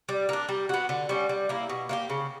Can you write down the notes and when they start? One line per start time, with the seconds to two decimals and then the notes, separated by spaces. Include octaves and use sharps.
0.09 G3
0.29 A#3 D4
0.49 G3
0.69 B3 F#4
0.89 D3
1.09 G3 C#4
1.29 G3
1.49 A#3 E4
1.69 B2
1.89 A#3 E4 G4
2.10 C#3